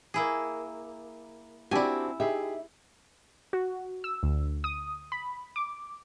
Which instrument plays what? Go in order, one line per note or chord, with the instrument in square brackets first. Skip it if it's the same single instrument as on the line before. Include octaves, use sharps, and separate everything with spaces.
[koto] A#3 E4 G#4
[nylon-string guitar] C4 D4 F#4 [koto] E4 G#5 [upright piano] G4 D5
[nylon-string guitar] D#4 E5 [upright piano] G4 G#4
[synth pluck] F#4
E6
D2
D#6
B5
D6